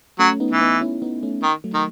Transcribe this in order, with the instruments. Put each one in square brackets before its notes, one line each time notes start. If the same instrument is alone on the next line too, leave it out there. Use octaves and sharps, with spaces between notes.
[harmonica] F#3 [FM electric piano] A3 C#4
[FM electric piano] B3 D#4
[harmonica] E3
[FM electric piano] B3 D#4
C#4 E4
B3 D#4
A3 C#4
[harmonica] D#3
[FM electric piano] F#3 A3
[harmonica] D#3